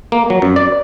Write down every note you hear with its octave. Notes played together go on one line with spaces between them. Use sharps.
A#3
F#3
F#2
D5